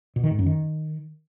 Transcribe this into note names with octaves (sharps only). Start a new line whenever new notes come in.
B2
D#3
G#2
F#2
D#3